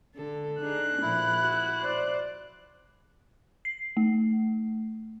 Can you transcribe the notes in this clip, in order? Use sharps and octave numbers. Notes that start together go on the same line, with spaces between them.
D3 A4
D4 D#4 G#4 F#6
A#2 F3 E4
F#4
C5 D5
C7
A3